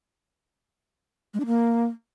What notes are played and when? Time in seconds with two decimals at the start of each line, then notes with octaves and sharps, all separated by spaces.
1.34 G#3
1.40 D4
1.46 A#3